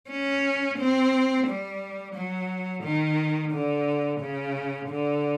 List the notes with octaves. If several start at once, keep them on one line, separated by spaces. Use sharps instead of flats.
C#4
C4
G3
F#3
D#3
D3
C#3
D3